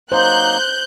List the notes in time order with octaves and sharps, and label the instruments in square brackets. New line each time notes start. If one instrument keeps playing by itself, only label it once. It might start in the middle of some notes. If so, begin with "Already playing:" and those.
[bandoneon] F#3 A#3 D#4 [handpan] C5 [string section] F#6 G6